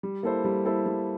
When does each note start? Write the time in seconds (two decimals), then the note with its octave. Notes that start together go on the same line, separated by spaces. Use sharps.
0.03 G3
0.23 A#3 E4 A4 C5
0.45 G3
0.65 A#3 E4 A4 C5
0.86 G3